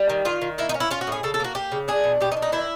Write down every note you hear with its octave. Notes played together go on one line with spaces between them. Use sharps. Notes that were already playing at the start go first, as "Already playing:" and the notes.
Already playing: G3
D#3
D#3 F4
D#3
A#3 E4
D#4
C#4
E4
C#4 F4
F#4
A2 G#4
C#3 A4
A4
A#3 F#4
A#3 G4
C#3
D4 G#4
B2
B2 G4
D#4
D4
D#4
D#3 E4